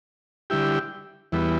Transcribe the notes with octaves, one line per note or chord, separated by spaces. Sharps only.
D3 G3 E4 G4
E2 E3 G3 B3